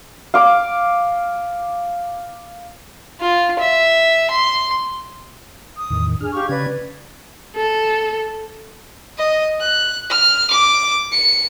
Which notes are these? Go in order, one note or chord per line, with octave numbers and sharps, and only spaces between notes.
F5 D6
F4
E5
C6
D#6
E2 A2 D#3
D4 G#4 F6
G4 F5 C#6
C#3 C#4 B4 D5 G#6
A4
D#5
F#6
F6
D6
C#7